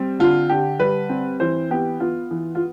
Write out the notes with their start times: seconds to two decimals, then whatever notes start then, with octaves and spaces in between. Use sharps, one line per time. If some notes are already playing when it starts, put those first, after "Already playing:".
Already playing: G3 C4
0.19 D3 F4
0.49 D3 G4
0.79 G3 B4
1.09 C4
1.40 E3 C5
1.71 B3 G4
2.00 B3 F4
2.31 E3
2.55 F4